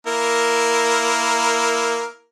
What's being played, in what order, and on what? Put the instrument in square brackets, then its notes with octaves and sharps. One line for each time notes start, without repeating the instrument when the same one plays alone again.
[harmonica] A#3 E4 A#4